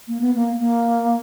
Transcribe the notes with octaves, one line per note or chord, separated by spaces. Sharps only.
A#3
B3
A#3
A#3